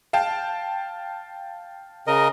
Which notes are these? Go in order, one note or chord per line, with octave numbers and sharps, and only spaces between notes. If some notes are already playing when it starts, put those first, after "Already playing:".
F5 G5 A5
C#3 A#4 D#5